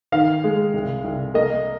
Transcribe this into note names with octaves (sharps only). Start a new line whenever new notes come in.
D#3 F5
G#3
C2
C2
A#3 D#5